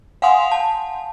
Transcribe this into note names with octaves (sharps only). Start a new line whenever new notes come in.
F5 F#5 G#5 C6 D#6 F7
A5